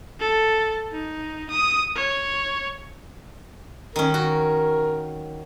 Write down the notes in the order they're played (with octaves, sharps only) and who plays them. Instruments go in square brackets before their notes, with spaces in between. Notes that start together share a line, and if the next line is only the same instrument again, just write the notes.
[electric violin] A4
D#4
D#6
C#5
[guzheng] D#3 C#4 [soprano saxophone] A#4
[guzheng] F#4